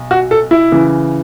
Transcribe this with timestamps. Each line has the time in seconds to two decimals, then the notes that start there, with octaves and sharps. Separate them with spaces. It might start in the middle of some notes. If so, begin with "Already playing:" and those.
Already playing: B1
0.11 F#4
0.31 A4
0.51 E4
0.72 C#3 E3